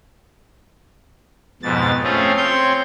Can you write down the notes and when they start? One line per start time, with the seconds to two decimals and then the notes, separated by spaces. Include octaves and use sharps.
1.63 F2 G#2 B2 A6
2.03 A3 C4 C#4 F4 G#4
2.37 C4 C#5 C6 G6